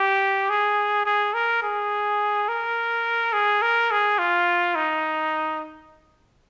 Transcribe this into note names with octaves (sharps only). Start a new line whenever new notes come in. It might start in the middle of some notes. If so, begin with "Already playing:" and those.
Already playing: G4
G#4
G#4
A#4
G#4
A#4
G#4
A#4
G#4
F4
D#4